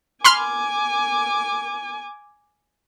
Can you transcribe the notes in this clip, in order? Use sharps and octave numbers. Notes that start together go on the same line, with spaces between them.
G#5 B5 C6 D6 F6